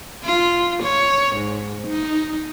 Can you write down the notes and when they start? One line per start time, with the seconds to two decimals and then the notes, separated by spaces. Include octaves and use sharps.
0.24 F4
0.84 C#5
1.37 G#2
1.88 D#4